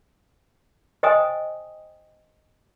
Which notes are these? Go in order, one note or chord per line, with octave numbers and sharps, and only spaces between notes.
C5 D#5 G5 G#5 D#6